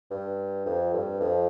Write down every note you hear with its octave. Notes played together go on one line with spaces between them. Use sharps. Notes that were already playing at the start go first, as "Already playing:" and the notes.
G2
F2
G2
F2